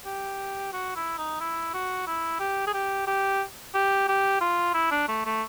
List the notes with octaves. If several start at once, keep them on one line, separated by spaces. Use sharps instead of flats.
G4
F#4
E4
D#4
E4
F#4
E4
G4
G#4
G4
G4
G4
G4
F4
E4
D4
A3
A3